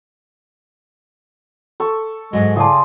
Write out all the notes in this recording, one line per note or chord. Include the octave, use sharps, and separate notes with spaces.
A4 C#6
G#2 F#3 G#3
C#3 E4 G#4 D5 A5 C6